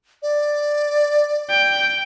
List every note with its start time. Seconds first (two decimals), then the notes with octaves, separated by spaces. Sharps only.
0.22 D5
1.50 G5